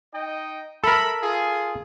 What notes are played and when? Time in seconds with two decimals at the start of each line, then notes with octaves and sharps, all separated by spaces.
0.13 D#4 D#5 G5
0.84 A4 A#4 E5 B5
1.22 F4 G#4